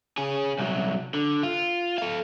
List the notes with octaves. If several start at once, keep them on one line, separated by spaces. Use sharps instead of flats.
C#4 G#4
C2 F#3
D3
F4
A4 F5